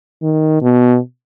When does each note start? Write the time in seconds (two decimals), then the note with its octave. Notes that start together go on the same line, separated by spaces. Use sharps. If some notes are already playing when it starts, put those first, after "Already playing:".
0.22 D#3
0.62 B2